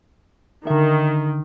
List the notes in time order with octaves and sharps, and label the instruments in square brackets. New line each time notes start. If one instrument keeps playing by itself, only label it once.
[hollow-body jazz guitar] D3 E5 [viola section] D#3